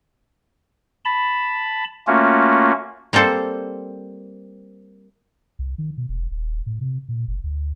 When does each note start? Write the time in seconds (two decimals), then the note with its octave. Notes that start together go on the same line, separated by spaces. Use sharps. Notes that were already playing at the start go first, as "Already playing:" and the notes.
1.05 A5 B5
2.07 A3 A#3 C#4 F4 F#4
3.13 G3 A#3 C4 A4 C5
5.59 C2
5.78 D#3
5.97 B2
6.09 E1
6.31 D#1
6.66 A2
6.81 C3
7.09 A#2
7.28 F#1
7.44 D2